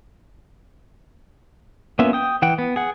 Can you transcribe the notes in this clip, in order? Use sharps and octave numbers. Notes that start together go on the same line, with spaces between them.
A#3 B3 C#4 F4 E5
G5 D#6
E3 F#5 G5
B3
G#4 F#5